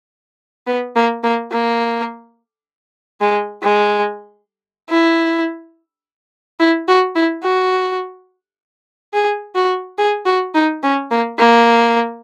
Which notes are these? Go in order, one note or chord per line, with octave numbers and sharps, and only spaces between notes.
B3
A#3
A#3
A#3
G#3
G#3
E4
E4
F#4
E4
F#4
G#4
F#4
G#4
F#4
D#4
C#4
A#3
A#3